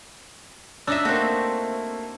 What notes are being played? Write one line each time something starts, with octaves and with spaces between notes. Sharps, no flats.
D4 D#4 E5 E6
A3 A#3 C4 F#4